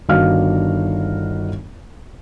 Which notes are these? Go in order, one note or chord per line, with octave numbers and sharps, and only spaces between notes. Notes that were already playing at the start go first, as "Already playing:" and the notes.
G1 D#3 D4 F#4 F5 F6